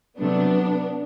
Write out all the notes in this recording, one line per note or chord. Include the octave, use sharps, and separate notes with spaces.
C3 F#3 A3 B3 D4